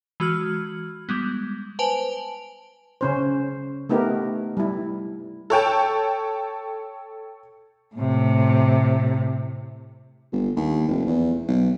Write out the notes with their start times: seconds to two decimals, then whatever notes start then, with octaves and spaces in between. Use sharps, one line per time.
0.20 E3 G#3 F#4 E6 F6 G#6
1.09 G3 G#3 B3
1.79 B4 C5 G#5 A5 D7 F7
3.01 C#3 C#4 C5
3.89 A3 B3 D#4 G4 A#4
4.57 G3 E4
5.50 A4 C#5 G5 A5
7.95 A2 C3
10.32 G1
10.56 D#2
10.88 F1
11.07 E2
11.48 B1